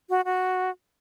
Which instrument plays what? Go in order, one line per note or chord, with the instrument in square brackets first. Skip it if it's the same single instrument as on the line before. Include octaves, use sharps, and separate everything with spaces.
[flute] F#4
F#4